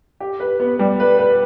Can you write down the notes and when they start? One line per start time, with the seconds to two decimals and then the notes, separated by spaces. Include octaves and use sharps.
0.20 G4
0.40 B4
0.60 B3
0.79 G3
1.00 B4
1.19 B4